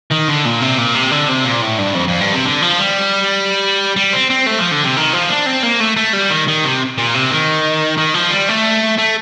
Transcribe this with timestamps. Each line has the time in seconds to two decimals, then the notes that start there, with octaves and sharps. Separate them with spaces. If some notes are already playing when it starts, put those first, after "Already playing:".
0.11 D#3
0.28 D3
0.45 A#2
0.61 C3
0.78 A#2
0.95 C3
1.11 D3
1.29 C3
1.45 A#2
1.62 A2
1.78 G2
1.95 F2
2.08 F2
2.21 G2
2.33 C3
2.45 D3
2.62 F3
2.79 G3
3.96 G3
4.13 C4
4.30 C4
4.47 A3
4.59 F3
4.72 D3
4.84 C3
4.97 D#3
5.13 F3
5.30 D4
5.46 C4
5.63 A#3
5.80 A3
5.97 A3
6.13 G3
6.30 D#3
6.48 D#3
6.64 C3
6.98 A#2
7.14 C3
7.31 D#3
7.98 D#3
8.14 F3
8.31 G3
8.49 A3
8.98 A3